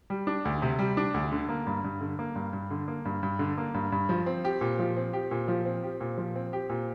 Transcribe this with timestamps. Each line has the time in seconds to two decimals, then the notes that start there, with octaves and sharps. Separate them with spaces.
0.10 G3
0.27 D4
0.45 D2
0.62 C3
0.79 G3
0.97 D4
1.14 D2
1.32 D3
1.49 A#3
1.67 G2
1.84 G2
2.01 D3
2.19 A#3
2.35 G2
2.53 G2
2.71 D3
2.88 A#3
3.05 G2
3.23 G2
3.39 D3
3.58 A#3
3.74 G2
3.92 G2
4.09 F3
4.26 C4
4.45 G4
4.61 A#2
4.79 F3
4.97 C4
5.13 G4
5.31 A#2
5.48 F3
5.65 C4
5.83 G4
6.01 A#2
6.18 F3
6.35 C4
6.53 G4
6.69 A#2